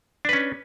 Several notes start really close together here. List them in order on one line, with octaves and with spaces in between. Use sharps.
D4 B4 C#4